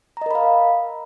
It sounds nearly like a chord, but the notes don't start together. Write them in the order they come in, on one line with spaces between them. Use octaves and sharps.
A#5 D#5 A#4 B5 F5